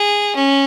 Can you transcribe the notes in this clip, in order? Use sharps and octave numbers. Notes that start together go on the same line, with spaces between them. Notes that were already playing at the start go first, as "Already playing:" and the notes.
Already playing: G#4
C#4